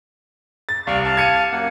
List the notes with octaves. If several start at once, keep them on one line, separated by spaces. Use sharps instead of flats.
A6
C2 D5 F5 C#6
F5 A5
G#6 C#7 D#7
F#2 A#3 F#5